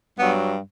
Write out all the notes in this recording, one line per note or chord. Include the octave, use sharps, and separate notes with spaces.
G2 F#3 B3